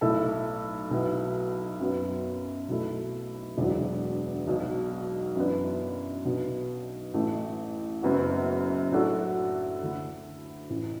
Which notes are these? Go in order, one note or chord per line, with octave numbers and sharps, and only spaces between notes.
B1 A2 A3 E4 A4
B1 B2 F#3 B3 E4
F#2 F#3 B3
B1 B2 A3 E4 A4
E1 E2 D3 F#3
B1 B2 F#3
F#2 E3 B3 D4
B1 B2 B3 D4
A1 A2 E3 A3
F#1 F#2 F#3 B3 F#4
A2 F#3 D4 F#4 A4
D2 D3 A3 E4
A1 A2 E3